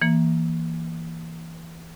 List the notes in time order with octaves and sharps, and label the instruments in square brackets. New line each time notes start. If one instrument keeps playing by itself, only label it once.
[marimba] E3 A#3